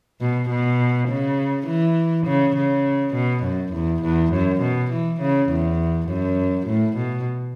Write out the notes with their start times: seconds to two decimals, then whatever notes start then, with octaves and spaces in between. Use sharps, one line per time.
0.21 B2
0.49 B2
1.09 C#3
1.67 E3
2.27 C#3
2.56 C#3
3.14 B2
3.44 F#2
3.73 E2
4.03 E2
4.33 F#2
4.61 B2
4.92 E3
5.21 C#3
5.50 E2
6.08 F#2
6.67 A2
6.97 B2